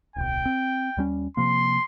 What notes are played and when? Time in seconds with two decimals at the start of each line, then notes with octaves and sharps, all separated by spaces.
0.16 D1 B1 G5
0.45 C4
0.97 D#2 G3 C#4
1.37 C3 F3 A#3 C6